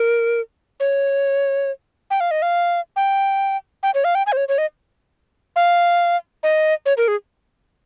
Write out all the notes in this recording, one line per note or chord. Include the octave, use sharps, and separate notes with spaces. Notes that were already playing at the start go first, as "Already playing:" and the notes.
Already playing: A#4
C#5
G5
F5
D#5
F5
G5
G5
C#5
F5
G5
G#5
C5
C#5
C#5
D#5
F5
D#5
C#5
A#4
G#4